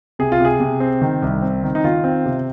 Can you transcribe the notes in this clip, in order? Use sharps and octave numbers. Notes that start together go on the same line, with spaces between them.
C3 G#4
F4
C3 G#4
C3
C4
D#3
C2
C4
D#3
D#4
D#3 F4
C4
C3